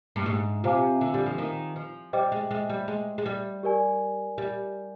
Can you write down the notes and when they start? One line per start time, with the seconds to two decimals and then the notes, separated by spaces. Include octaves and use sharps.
0.16 G2
0.26 G#2
0.63 C3 F4 C5 F5 G#5 D6
1.01 D3
1.14 G3
1.26 F3
1.38 D#3
1.76 F3
2.13 G3 C5 D#5 G5 D6
2.32 G#3
2.51 G#3
2.69 G3
2.88 G#3
3.18 G#3
3.26 G3
3.63 G4 A#4 D5 G#5
4.38 G3